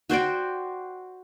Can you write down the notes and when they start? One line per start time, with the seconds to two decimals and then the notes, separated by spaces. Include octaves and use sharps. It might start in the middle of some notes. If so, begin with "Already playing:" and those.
0.10 F#4 C5 D5 G5